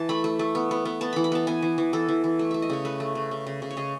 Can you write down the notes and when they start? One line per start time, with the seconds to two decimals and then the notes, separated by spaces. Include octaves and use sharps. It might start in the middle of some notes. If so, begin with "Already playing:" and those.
Already playing: E3 A5
0.09 A3 B5
0.24 A3
0.39 A3
0.55 B3
0.71 B3
0.85 B3
1.01 B3 A5
1.13 E3 B5
1.24 B5
1.32 B3 A5
1.47 B3 G#5
1.62 E3
1.78 E3
1.93 E3 A4
2.09 E3
2.24 E3
2.39 A3
2.51 A3 E5
2.62 D#5
2.70 C#3 C#5
2.85 A3 B4
3.00 A3
3.15 C#3
3.31 C#3
3.47 C#3
3.62 C#3
3.71 C#5
3.77 C#3 D#5